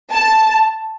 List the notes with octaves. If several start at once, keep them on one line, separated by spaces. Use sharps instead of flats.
A5